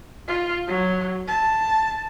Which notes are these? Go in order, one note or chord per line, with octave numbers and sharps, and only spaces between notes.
F4
F#3
A5